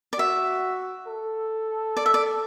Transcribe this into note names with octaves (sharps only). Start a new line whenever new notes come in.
D5
F#4 E5
A4
D5
E5
D5